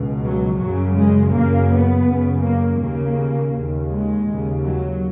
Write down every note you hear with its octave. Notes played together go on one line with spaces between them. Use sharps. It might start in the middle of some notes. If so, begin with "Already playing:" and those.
Already playing: C#2 B2
F#3
F#2 C#3 F#3
G#3
F#2 C#3 A#3
B3
F#2 C#3
A#3
D#2 C#3 A#3
D#2 C#3
G#3
D#2 C#3
F#3